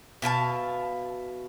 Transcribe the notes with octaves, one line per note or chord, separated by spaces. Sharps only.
B2 E5 F5 A5